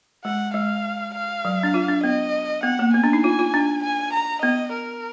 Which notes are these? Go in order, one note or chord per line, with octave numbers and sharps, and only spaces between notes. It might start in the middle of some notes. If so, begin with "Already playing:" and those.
G#3 F#5
G#3 F5
F5
F#3
D4
F4
D4
B3 D#5
B3 F#5
A#3
B3 G#5
D4
D#4
F4 G#5
F4
D4
G#5
A#5
B3 D#5
A#4